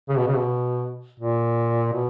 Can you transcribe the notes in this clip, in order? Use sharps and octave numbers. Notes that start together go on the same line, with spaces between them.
C#3
B2
C#3
B2
A#2
B2